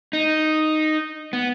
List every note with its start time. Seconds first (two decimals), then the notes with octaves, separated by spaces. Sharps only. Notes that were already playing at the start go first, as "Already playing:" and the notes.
0.13 D#4
1.33 B3